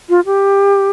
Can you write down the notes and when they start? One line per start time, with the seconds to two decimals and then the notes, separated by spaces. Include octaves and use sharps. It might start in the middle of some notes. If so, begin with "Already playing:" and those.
0.09 F4
0.26 G4